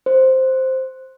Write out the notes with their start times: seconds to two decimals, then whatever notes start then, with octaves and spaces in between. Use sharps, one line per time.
0.06 C5